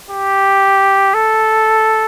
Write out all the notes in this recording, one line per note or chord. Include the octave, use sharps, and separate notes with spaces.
G4
A4